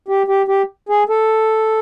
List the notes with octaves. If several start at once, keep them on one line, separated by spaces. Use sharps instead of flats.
G4
G4
G4
G#4
A4